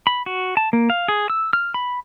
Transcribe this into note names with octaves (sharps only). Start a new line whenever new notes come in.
B5
F#4
A5
A#3
F5
G#4
E6
F6
B5